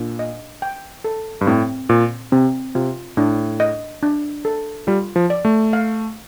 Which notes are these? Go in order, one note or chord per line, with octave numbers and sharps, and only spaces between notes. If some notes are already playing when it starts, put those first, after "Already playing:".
Already playing: A#2 D4
D#5
G5
A4
G2
A2 C4
A#2 C5
C3 C4
C3 F4
A2 D4
D#5
D4
A4
G3 F4
F3
D5
A3
F5